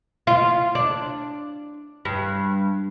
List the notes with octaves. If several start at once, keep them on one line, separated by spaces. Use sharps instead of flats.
F4
D4
G2